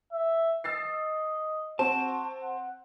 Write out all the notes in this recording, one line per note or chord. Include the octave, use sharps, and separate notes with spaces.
E5
D#5 E6 A6 C7
C4 F#4 A5
F#5